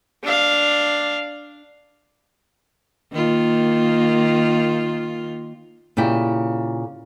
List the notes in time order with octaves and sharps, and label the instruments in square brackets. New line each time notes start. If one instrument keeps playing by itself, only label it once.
[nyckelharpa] D4 F5
[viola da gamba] D#3 A#3 F4
[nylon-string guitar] A#2 C#3 E4 G4